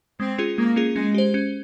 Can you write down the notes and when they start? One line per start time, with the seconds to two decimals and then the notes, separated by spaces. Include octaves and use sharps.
0.20 G#3 C4
0.38 C#4 F4 G#4
0.57 G#3 A#3
0.76 C#4 F4 G#4
0.96 G#3 C#4
1.14 G4 C5
1.34 C#4